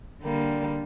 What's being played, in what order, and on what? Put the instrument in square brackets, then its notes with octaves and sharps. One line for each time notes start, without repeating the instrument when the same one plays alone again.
[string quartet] D3 G3 A#3